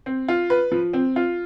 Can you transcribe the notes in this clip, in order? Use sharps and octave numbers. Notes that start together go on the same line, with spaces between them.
C4
F4
B4
F3
C4
F4